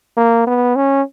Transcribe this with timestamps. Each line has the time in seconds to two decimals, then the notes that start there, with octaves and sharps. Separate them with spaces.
0.17 A#3
0.47 B3
0.76 C#4